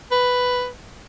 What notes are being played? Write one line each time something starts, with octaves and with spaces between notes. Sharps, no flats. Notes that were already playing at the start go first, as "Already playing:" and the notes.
B4